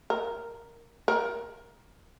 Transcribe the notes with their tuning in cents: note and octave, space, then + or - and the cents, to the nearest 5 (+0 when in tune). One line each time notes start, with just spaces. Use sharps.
A#4 +0
A#4 +15